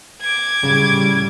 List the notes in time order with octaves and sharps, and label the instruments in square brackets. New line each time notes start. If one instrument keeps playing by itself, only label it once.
[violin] D6 G#6
[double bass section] A2 G3 [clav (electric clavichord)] C#3